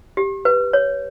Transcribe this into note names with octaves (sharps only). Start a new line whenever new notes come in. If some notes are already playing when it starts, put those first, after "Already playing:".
G4
B4
C#5